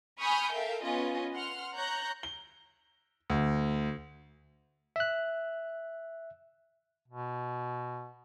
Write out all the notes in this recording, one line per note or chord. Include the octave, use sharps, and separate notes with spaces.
G#5 B5 C#6 D#6 F6 G6
A4 A#4 E5 F5 G5
B3 C#4 F4 D#5 G#5
F#5 C6 F6
C#5 A#5 F#6 G6
G7
D2
E5 F#6
B2